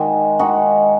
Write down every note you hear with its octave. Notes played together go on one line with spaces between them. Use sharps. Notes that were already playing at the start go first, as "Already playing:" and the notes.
Already playing: D#3 G#3 D#4 F#4
D#3 G#3 D#4 F#4